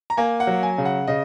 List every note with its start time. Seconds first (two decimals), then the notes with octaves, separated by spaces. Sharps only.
0.10 A#5
0.17 A#3 G#5
0.40 F#5
0.47 F#3
0.63 G#5
0.78 C#3
0.85 F#5
1.08 C#3 D#5